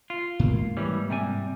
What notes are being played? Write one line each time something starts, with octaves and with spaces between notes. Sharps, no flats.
F4
G#2 A#3
E3 G3 C#4
C3 G3 G#5